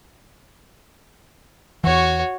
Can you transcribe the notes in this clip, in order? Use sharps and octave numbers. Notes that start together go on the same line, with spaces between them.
E2 E3 F#4 C#5